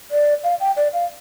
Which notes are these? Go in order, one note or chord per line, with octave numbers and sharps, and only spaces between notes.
D5
F5
G5
D5
F5